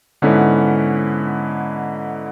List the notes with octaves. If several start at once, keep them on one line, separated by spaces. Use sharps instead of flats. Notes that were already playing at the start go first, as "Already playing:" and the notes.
G#2 D3 B3 C#4 E4